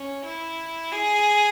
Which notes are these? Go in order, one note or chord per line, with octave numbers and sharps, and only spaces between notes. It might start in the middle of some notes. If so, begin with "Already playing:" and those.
Already playing: C#4
E4
G#4